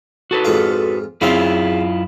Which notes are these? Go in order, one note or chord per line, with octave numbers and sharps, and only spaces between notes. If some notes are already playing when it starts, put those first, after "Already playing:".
F#4 A4 B4
F2 G#2 F4
F#2 C#3 C4 E4 F4